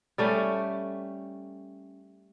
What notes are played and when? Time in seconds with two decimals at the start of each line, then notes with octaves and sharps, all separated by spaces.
0.18 G3 A3 C#4